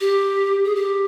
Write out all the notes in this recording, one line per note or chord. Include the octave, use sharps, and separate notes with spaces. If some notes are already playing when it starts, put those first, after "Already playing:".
G4
G#4
G4